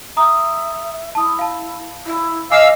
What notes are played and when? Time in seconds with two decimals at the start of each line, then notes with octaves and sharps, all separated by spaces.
0.17 E5 A#5 D#6
1.15 E4 A5 D#6
1.39 F5 A5
2.06 E4
2.51 D#5 F5 G#5 D6 E6